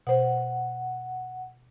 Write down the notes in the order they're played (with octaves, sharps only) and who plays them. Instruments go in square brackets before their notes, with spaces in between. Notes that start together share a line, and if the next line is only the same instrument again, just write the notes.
[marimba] B2 C5 [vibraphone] F#5